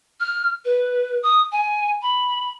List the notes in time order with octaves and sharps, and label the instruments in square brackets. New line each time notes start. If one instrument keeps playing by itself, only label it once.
[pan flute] F6
B4
D#6
G#5
B5